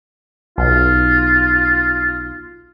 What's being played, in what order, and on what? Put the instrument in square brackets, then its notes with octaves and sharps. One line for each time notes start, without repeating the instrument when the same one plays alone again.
[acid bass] B1 [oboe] F4